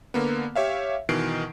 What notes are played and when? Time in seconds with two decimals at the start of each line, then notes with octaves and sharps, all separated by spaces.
0.14 D3 A#3 B3
0.56 G4 C#5 E5 F5
1.09 B2 D#3 E3 C7 D7